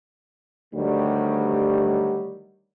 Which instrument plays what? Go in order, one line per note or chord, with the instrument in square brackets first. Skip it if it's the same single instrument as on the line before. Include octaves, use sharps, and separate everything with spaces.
[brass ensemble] D2 D#3 F#3 G3